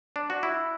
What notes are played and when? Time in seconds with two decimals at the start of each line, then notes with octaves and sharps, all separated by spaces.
0.16 D4
0.30 F#4
0.43 E4